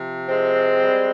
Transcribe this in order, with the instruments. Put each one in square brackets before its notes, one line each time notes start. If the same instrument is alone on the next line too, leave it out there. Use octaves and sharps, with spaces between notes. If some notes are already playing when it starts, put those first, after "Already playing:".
Already playing: [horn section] C3 F3
G#3 C4
G3